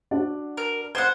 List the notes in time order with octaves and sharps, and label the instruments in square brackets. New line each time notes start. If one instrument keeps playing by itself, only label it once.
[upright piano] D4 F#4 D5
[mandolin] A#4
[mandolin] C5 F#5 [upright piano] G#6 G7